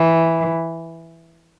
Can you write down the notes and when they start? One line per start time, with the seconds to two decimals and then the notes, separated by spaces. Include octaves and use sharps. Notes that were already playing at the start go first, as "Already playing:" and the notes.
Already playing: E3